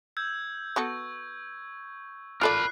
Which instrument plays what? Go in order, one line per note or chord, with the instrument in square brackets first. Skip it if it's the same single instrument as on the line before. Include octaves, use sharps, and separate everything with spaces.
[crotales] E6 G6 G#6
[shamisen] B3 F#4 A4 [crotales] C#6
[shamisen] F4 A4 D5 [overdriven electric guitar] A#4 B5 [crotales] F#6 C7